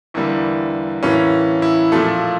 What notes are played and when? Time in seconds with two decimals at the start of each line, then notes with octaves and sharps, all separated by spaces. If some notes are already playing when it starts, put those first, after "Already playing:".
0.14 E2 D3 G3 A#3 E4
1.03 A2 E3 A#3 C#4
1.62 E4
1.92 A#2 F3 A3 A4